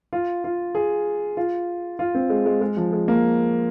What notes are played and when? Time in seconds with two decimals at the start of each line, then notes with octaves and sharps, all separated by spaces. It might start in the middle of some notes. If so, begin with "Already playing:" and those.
0.13 F4
0.44 F4
0.75 G#4
1.37 F4
1.99 F4
2.15 C4
2.30 G#3
2.46 G#3
2.61 G#3
2.77 F3
2.93 G#3
3.08 A#3